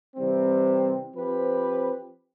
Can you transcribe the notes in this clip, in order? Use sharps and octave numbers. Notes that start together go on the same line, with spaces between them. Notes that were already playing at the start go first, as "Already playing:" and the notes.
C3 E3 G3 C4
F3 C4 G4 B4